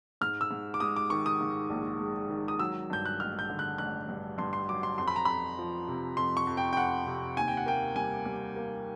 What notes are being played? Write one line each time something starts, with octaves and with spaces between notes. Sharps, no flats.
G#2 F6
E6
G#2
D6
G#3 D#6
D6
D#3 C#6
D#6
G#2
A#1
G#3
D#3
D#6
F#3 E6
G2 G6
F#6
A1 F6
G6
D3
F#6
A1 F#6
G2
G2 C6
C6
F#3 D6
C6
F2 C6
B5
A#5
F2 B5
F3
C3
F2 C6
C#6
F2
G5
G5
F2 F#5
C3
D#2 G#5
G5
F#5
A#3 G5
G3 G#5
G3
A#3